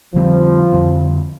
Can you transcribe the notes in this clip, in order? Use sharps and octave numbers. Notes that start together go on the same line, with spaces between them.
F2 D3 F3 G3 C4
F2 D3 G3 C4